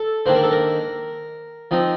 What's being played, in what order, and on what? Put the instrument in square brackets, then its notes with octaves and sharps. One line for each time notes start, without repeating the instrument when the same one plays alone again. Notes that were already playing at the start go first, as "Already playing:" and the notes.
Already playing: [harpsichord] A4
D#3 A#3 D4 C5
A#4
A4
A#4
F3 C4 D#4